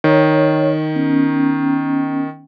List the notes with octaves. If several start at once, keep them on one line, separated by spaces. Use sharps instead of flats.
D#3 C#5
B3 C#4